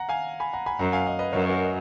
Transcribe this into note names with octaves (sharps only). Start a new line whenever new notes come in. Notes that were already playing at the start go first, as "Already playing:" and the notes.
Already playing: F#5 A#5
F5 G#5
G#5 B5
F#5 A#5
G#5 B5
F#2 F#5 A#5
F5 G#5
D#5 F#5
B4 D#5
F#2 A#4 C#5
F#4 A#4
D#5